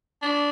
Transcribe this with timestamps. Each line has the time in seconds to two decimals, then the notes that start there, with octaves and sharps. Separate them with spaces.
0.22 D4